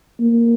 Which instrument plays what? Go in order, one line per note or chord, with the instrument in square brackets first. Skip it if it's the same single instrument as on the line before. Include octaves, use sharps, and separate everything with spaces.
[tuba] A#3